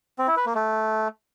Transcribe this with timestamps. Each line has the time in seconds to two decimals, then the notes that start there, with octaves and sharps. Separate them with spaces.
0.19 C4
0.28 E4
0.37 B4
0.46 A#3
0.55 A3